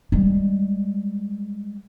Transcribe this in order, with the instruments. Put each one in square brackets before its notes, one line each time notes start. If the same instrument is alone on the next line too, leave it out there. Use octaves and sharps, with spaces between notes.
[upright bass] G3 G#3